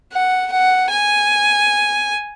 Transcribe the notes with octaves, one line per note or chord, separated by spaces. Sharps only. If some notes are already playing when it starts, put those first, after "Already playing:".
F#5
F#5
G#5